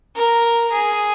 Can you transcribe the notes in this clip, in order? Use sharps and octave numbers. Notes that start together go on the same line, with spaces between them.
A#4
G#4